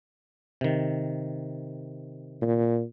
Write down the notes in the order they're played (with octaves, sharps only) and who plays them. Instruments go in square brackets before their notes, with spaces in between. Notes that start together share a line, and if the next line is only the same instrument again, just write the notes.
[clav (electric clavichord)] C3 D#3
[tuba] A#2